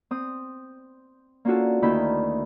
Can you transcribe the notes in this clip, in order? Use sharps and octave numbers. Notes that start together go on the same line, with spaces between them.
C4 D#6
A#3 C#4 D4 F4 F#4 A4
D2 D#3 A#3 E4 G5 B5